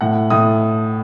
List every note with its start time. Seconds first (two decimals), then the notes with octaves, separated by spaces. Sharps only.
0.01 A2 F#5
0.30 A2 D#6